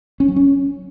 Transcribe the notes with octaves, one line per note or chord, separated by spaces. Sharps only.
C#4
F#3
C#4